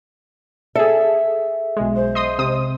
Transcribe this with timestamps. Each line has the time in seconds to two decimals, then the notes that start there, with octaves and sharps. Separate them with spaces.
0.75 G#4 A4 E5
1.77 B1 G#3
1.96 C5
2.15 D#5 C6 D#6
2.39 C3 D#6